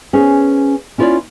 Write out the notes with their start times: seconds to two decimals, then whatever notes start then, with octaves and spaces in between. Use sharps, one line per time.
0.13 B3 C#4 G#4 C5
0.98 C#4 E4 F4 A#4 C#5 D5